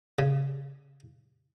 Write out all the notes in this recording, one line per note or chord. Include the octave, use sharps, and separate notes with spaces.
C#3